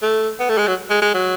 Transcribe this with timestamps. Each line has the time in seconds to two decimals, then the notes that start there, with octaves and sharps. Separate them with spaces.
0.02 A3
0.40 B3
0.49 A3
0.58 G#3
0.68 F#3
0.90 G#3
1.02 G#3
1.14 F#3